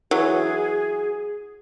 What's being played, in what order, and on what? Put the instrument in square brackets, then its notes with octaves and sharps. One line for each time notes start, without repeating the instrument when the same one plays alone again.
[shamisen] E3 F#3 [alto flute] G#4